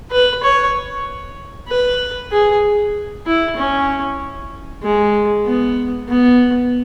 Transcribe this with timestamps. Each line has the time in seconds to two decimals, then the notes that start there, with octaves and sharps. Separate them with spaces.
0.11 B4
0.43 C#5
1.69 B4
2.32 G#4
3.26 E4
3.57 C#4
4.83 G#3
5.46 B3
6.09 B3